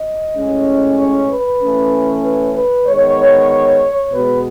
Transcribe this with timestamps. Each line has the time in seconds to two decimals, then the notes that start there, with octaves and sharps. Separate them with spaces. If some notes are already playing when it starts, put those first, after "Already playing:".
Already playing: D#5
0.36 A2 G#3 C#4
0.98 C#5
1.30 B4
1.62 E3 A3 C#4
2.23 B4
2.55 B4
2.86 D#3 G#3 B3 C#5
4.11 B2 G#3 B3 B4